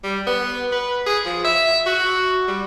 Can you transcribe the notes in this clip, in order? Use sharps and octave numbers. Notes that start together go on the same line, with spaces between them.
G3
B3
B4
G#4
F3
E5
F#4
G3